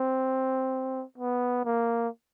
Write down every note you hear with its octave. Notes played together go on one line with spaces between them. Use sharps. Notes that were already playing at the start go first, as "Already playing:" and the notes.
Already playing: C4
B3
A#3